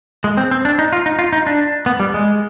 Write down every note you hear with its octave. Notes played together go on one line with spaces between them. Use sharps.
G#3
C4
C4
D4
D#4
F4
D#4
F4
D#4
D4
B3
G3
G#3